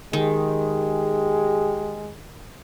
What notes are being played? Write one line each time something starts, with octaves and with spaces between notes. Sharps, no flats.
D#3 G#3 G4 G#4